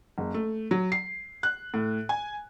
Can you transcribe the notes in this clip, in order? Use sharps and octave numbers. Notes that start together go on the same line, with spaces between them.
F#1
A3
F#3
C7
F#6
A2
G#5